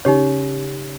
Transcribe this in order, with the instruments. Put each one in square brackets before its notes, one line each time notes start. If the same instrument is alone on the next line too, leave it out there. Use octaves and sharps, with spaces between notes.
[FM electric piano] C#3 C#4 [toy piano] D#4 G4 C#5